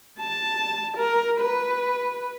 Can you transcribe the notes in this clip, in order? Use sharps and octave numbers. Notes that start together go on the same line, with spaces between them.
A5
A#4
B4